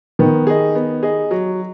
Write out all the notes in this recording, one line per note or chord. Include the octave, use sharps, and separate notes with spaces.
D#3 B3
G#4 D#5
B3
G#4 D#5
F#3